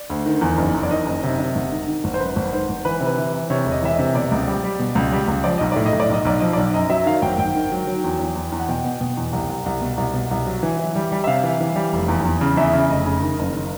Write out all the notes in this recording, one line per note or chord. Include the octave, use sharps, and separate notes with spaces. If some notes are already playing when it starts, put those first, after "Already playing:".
Already playing: D5
D2
D#3
E2
F#1
E2
D5
D#3 D#5
F#1
C3
C3
G#1
D#3
D#3
G#1
C5
F#2 B4
G#1
D#3 C5
G#1
E3 B4
C3
B4
E3
E3
C3 C#5
E1
D#5
E3 E5
D#5
C3
B2 D5
C#2
G3
G3
B2
C#2
G3
C#2
F3 D5
B1 D#5
A2 D5
D#5
A2
D5
B1 D#5
B1 D5
F3 D#5
B1 D5
F#2 D#5
F#3 E5
D#3 F5
G#1 G5
G#1 G5
D#3
F#3
F#3
E2
E2
E2
E2
F#5
B2 G5
B2
B2
E2
C2
C2
C2
B2
C2
B2
C2
F#3
E3
E3
G3
G3
E5
C3 F5
E3
E3
G3
F1
E2
E2
C#3
E2 E5
C#3
F1 D#5
C#3
D#3
F#1
D#3